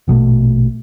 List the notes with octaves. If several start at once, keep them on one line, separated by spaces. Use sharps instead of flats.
A#1 B2 E3 A3